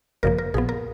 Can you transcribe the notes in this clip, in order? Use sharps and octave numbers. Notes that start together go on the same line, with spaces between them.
G#1 F#2 C#3 F3 A#3 A#4
A#4
A#1 A#2 F3 B3 G#4
A#4